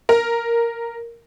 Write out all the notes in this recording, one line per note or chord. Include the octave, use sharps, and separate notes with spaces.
A#4